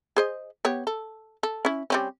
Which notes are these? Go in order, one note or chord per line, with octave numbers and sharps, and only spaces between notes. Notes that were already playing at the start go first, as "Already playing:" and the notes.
G#4 C5 D#5
B3 G4 C#5
A4
A4
C#4 E4
G3 C4 C#4